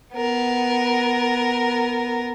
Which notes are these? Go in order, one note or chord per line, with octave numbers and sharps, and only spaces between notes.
B3 A#4